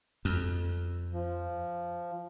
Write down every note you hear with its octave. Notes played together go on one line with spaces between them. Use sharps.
F2
F3